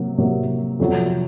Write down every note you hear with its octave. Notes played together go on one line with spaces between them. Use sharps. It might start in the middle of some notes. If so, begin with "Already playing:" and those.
Already playing: C3 F#3 A#3
C3 F#3 A#3
F2 C3 F#3